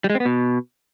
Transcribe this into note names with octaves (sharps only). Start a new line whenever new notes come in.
G3
G#3
C4
B3
B2